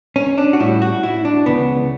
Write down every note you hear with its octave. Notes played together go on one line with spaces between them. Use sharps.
C#4
D4
F#4
A2 G3 E4
F#4
E4
D4
C#2 C#3 E3 B3